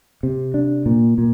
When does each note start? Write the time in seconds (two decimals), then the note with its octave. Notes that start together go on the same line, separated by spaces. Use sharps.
0.23 C3
0.54 D4
0.86 A#2
1.18 A#2